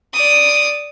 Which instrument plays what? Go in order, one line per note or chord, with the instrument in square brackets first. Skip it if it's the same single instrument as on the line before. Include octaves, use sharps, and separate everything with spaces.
[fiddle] D5 D#6